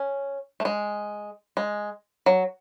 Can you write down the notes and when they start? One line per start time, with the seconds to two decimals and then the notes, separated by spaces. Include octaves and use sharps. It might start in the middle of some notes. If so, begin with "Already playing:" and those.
Already playing: C#4
0.60 A3
0.65 G#3
1.57 G#3
2.26 F#3